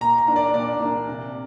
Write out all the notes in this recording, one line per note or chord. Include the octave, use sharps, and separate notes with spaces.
A#2 A#5
A#5
A#3 D4
D5
A#2 D5
A#3 D4
C3